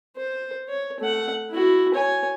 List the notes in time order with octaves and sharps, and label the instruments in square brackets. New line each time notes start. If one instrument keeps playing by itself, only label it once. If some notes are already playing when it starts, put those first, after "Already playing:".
[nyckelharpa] C5
C#5
A3 F#5
E4 F#4
C#5 G#5